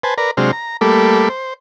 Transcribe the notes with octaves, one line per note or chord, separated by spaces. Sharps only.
B4 C5 G#5 A5
A#4 B4 D5 A#5
C3 F#3 G#3 D4 C5 F6
A#5
G3 A3 A#3 A4 B5 D6
C5